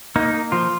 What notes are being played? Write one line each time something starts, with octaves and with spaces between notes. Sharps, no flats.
A#3 D#4
A#3
F3 F4